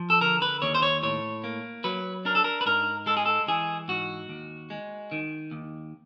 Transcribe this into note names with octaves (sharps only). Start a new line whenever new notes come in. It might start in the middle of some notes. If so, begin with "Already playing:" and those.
Already playing: F3
A4
D3 A#4
B4
D#2 C#5
C5
C#5
A2 C#5
A#3
F#3 B4
D4 A#4
A4
A#4
B4
G#2 A#4
G#3 A4
G#4
A4
E3 G#4
G#2 F#4
D#2
G#3
D#3
D#2